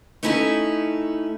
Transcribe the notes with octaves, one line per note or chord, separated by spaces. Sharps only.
A3 C#4 D#4 E4 F#4 A4